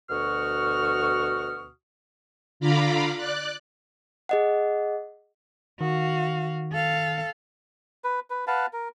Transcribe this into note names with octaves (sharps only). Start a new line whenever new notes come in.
D2 B2 F#4 C#6 D#6 F6
D3 F4 F5 A#5 B5 D6
D5 F#6
G#4 D#5 F#5
D#3 F#4 F5
A4 F5
B4
B4
B4 F5 F#5 A5
A#4